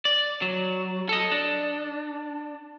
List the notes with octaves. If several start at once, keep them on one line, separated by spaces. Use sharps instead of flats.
D5
F#3
A4 D#5
D4